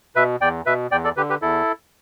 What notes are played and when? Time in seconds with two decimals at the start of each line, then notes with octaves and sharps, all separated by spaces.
0.16 B2 B4 E5
0.41 E2 D5 G5
0.66 B2 B4 E5
0.91 E2 D5 G5
1.04 A4 D5
1.17 D3 G4 B4
1.29 G4 B4
1.42 E2 E4 A4